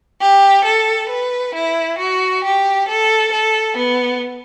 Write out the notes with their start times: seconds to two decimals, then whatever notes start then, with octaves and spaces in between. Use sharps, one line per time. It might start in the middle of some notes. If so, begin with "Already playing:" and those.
0.21 G4
0.65 A4
1.10 B4
1.55 E4
1.99 F#4
2.44 G4
2.88 A4
3.33 A4
3.77 B3